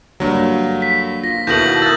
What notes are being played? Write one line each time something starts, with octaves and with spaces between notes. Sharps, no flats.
G2 D3 F#3 A#3
B6
F4 A#6
D#2 B2 E4 A4 G6 A#6 F#7
A#4 D#6 E6 F#6 A6